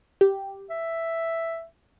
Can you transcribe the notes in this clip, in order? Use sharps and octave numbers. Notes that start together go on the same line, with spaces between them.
G4
E5